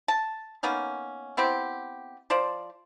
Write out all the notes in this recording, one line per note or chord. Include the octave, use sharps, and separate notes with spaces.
A5
A#3 B3 C#4 D#4
B3 C4 E4 G4
F3 C5 D5